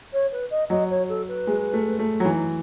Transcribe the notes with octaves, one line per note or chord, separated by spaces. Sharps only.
C#5
B4
D#5
F#3 D#5
C#5
A4
B4
G#3
A3
A3
F#3
E3 D#4